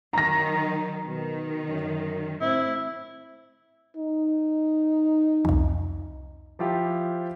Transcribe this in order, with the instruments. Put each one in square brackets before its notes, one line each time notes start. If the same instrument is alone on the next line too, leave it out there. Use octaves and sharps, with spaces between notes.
[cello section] D#3 F#3 [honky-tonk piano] A#5 A#6
[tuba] B2 [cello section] D#3
[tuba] F#2
[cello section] A2 [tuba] C4 [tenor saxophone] E4
[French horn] D#4
[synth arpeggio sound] C2 F2
[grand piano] F3 E4 F4 G4